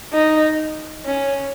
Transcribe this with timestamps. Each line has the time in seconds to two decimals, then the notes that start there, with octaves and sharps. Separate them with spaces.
0.13 D#4
1.06 C#4